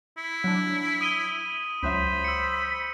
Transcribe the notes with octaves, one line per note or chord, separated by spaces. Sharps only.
E4
F#3 D4
D#6 D#7 G7
C#2 F#3 C5 E5 B5
E6 C#7